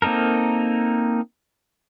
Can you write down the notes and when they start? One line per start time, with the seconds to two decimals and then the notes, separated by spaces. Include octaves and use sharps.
0.02 A#3 C4 D#4 A4 A#4